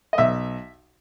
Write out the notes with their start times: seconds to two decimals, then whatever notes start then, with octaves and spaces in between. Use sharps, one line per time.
0.13 D#5
0.18 B1 E5